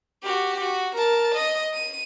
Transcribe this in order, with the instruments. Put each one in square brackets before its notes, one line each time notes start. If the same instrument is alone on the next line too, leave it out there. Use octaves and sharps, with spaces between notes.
[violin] F#4 G4
F#4
A#4 A5
D#5
D#7